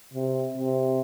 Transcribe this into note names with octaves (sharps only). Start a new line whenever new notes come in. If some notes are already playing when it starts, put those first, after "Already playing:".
C3
C3